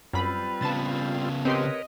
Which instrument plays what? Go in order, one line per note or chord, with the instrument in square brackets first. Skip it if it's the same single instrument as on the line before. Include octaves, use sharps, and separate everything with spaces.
[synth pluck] F#2 B5 [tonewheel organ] G3 C4 F4 [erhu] B4
[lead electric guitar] C#3 B3 [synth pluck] A5 A6
[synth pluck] C4 G4 C6 [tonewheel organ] A#4 B4 C#5 [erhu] D#5